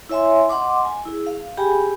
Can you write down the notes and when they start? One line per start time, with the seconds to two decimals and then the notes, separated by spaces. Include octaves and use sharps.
0.09 E4 C#5 E5 G#5 C6
0.49 D#5 F#5 C6 D6
0.85 G#5
1.05 E4 G#4
1.27 F5
1.58 G4 G#4 G5 G#5 B5